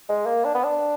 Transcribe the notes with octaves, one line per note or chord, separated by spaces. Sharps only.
G#3
A#3
D4
B3
D4